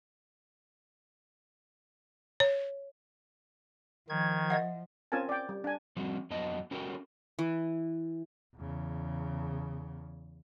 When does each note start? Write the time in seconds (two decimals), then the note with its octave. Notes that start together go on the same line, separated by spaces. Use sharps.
2.40 C#5
4.09 D#3 F3 G#6
4.50 D#5 E5 F#5
5.12 C4 C#4 F4 A#4 G#5 A5
5.29 D5 G5
5.49 G3
5.64 D4 G#5
5.97 F3 G3 C4 F#4
6.30 F2 F#3 B3 D#5 A5
6.71 C#4 F#4 G4 A4 A#4 G5
7.39 E3
8.55 E2 C#3